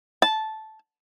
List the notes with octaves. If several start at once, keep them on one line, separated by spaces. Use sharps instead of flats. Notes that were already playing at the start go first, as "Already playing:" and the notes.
A5